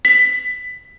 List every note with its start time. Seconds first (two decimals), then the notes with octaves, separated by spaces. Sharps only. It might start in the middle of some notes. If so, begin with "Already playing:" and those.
0.05 B6